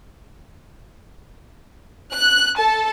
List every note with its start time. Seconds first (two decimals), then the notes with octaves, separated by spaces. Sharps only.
2.13 F#6
2.58 A4 A5